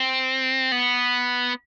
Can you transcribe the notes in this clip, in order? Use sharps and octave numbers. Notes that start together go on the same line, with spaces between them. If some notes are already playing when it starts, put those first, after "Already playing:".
Already playing: C4
B3